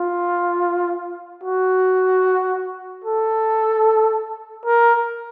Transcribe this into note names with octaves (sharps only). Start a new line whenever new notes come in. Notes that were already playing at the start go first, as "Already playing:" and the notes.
Already playing: F4
F#4
A4
A#4